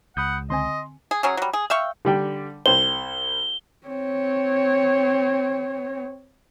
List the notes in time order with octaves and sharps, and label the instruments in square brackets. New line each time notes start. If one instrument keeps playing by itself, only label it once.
[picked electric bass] C#2 [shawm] F#5 [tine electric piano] B5 D#6 G6
[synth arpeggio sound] D3 C4 G#5 [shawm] D#5 [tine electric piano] C6
[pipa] G#4
F#3 C#4 G#4
F#3 G3
G#4
E5 F5 G5 C#6
[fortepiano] D3 G3 G5
[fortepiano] C2 C5 [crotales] G7
[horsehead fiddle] C4 C#5